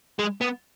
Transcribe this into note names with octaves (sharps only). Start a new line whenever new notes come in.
G#3
B3